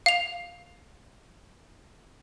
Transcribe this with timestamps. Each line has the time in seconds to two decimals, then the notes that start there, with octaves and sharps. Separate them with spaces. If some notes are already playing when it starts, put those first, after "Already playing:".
0.06 F5 F7